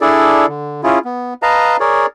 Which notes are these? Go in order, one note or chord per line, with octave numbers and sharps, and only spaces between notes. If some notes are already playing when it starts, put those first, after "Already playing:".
D4 E4 G#4 A4 D5
D3
C#4 E4 F4 G#4
B3
B4 D#5 F5 A5 A#5
G#4 A#4 C#5 D5